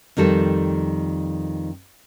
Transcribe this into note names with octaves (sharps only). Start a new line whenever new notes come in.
F2 D#3 G3 A4